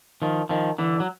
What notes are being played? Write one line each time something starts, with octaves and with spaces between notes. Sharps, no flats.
D#3 F3
D#3 F3
D3 E3
F#3